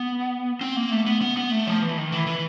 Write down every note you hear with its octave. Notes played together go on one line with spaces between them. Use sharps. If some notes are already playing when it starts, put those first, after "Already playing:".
Already playing: B3
C4
A#3
A3
B3
B3
B3
A3
F3
E3
D#3
E3
E3